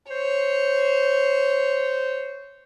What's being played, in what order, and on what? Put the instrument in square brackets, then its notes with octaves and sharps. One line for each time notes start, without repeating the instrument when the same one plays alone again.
[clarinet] C5 [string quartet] C#5